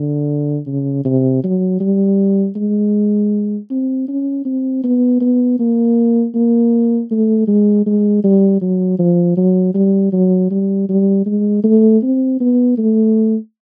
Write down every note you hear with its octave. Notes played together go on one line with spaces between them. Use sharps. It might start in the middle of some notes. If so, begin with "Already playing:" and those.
Already playing: D3
C#3
C3
F#3
G3
G#3
C4
C#4
C4
B3
B3
A#3
A#3
A3
G#3
G#3
G3
F#3
F3
F#3
G3
F#3
G3
G3
G#3
A3
C4
B3
A3